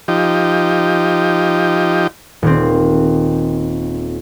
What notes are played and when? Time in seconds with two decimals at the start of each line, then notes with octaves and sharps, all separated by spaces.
0.08 F3 D#4 G4
2.42 D#1 C4